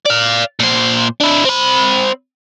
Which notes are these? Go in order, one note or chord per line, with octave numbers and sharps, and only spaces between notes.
D5 F5
A#2 C5
D4 E4
C4 B5